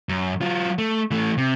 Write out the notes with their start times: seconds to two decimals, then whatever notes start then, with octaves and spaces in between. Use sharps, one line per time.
0.09 F#2
0.41 F#3 F4
0.78 A3
1.11 E3 A3
1.37 C3